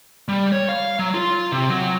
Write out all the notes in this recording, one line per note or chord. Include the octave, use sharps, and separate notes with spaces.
G3
C#5
F5
F#3
F4
C3
F#3